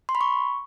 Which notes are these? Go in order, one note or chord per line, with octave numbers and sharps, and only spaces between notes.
C6
B5
C#6